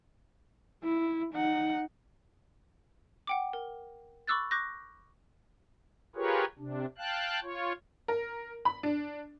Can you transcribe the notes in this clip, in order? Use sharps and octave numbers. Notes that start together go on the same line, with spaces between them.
E4
D#4 F#5
F#5 G5 D6
A#4
B5 C#6 D6 E6 F#6 A6
C#6 D6 F#6 G6 A#6
F4 G4 G#4 A#4 B4 C#5
C3 D4
F5 G5 A5 F#6
F4 C#5
A#4
B5
D4